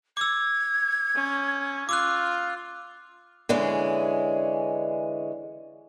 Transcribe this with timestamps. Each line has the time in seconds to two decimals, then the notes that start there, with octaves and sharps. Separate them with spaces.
0.17 D6 E6 G#6
1.15 C#4
1.89 F4 D6 E6 F#6
3.49 D3 E3 G#3 C#4